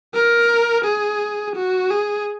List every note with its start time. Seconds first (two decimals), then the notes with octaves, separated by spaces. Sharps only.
0.14 A#4
0.85 G#4
1.55 F#4
1.90 G#4